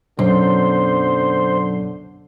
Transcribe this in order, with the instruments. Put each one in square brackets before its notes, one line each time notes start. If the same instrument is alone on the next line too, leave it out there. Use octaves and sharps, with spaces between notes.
[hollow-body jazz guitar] B1 [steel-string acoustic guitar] F#2 [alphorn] D3 [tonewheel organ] C5